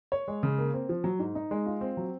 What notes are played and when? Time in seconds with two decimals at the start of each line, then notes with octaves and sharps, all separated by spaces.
0.12 C#5
0.28 G#3
0.43 C#3
0.58 A#3
0.73 C4
0.89 F3
1.04 F#3
1.19 G#2
1.35 D#4
1.51 G#3
1.66 F4
1.81 C4
1.97 F#3